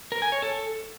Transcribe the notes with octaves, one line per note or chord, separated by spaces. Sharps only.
A#4
G#5
C#5
A4